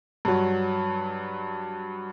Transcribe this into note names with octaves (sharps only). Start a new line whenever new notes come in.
G2 F#3